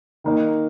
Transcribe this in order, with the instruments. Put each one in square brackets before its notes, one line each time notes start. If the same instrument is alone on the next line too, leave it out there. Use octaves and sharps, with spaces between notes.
[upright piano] D#3 A#3 D#4